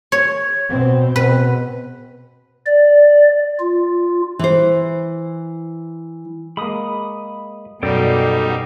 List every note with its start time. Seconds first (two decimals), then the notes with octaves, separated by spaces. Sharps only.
0.12 C#5
0.70 B2 C4
1.16 B2 B4
2.66 D5
3.59 F4
4.39 E3 C5
6.57 G#3 A#3 B5 D#6
7.83 F#2 B2 G3 D#4 A4 D5 G5